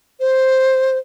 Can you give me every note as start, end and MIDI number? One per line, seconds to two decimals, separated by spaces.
0.20 0.98 72